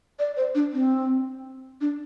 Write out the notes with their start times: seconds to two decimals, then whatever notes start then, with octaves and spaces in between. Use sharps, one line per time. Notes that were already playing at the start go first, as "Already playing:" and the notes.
0.19 D5
0.37 C5
0.55 D4
0.73 C4
1.81 D4